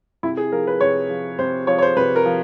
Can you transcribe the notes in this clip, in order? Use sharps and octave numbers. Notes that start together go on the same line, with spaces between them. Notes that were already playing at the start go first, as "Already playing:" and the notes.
C3 E4
G#4
F3 A#4
B4
C3 C#5
F3
C3 C5
F3 C#5
C#5
C5
C3 B4
A#4
F3